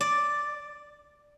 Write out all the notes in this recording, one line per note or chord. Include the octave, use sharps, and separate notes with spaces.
D5